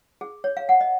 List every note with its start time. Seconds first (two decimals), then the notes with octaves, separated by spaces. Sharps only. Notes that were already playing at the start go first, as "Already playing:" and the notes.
0.21 G#4
0.44 C#5
0.57 F5
0.69 F#5
0.81 D#5